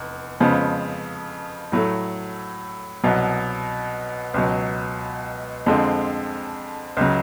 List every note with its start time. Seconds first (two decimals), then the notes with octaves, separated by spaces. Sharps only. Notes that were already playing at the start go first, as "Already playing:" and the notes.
Already playing: F1 E2
0.40 F2 C#3 F3 G#3 B3
1.72 A2 F#3 A3
3.03 C2 B2 F#3
4.34 C#2 B2 F#3
5.66 F2 D3 F3 G#3 C4
6.97 C#2 C#3 F#3